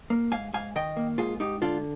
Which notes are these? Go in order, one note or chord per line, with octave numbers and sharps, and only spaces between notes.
A#3
G#2 F5 G#5
G#2 F5 G#5
D#3 D#5 G5
A#3
G#2 F4 G#4
G#2 D#4 G4
D3 D4 F4